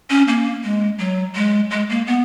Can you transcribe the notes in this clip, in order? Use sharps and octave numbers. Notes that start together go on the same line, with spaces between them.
C#4
A#3
G#3
F#3
G#3
G#3
A#3
B3